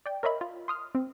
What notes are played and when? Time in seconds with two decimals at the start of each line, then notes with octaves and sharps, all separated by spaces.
0.06 D5 G5
0.23 A#4 C#5 D#5 E5 B5
0.41 F4
0.68 C6 D#6 F6
0.95 C4